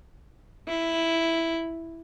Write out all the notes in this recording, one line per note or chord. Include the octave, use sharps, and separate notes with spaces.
E4